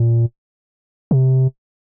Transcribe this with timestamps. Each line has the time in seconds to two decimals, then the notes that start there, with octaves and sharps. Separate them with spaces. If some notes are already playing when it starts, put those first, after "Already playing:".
Already playing: A#2
1.11 C3